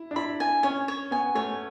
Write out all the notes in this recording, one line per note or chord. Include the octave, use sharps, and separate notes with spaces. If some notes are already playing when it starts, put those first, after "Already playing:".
Already playing: E4
D4
E4 B5
G#5
C#4 C#5
C#5
B3 G#5
A3 C#5